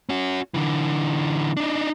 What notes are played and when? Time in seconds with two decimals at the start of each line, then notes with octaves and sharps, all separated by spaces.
0.09 C#4 F#4
0.54 D3 E3
1.57 D4 D#4